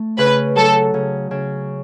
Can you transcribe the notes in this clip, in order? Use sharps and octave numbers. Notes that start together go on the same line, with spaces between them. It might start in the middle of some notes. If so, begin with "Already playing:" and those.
Already playing: A3
C#3 B4
F#3 A4
C#3
C#3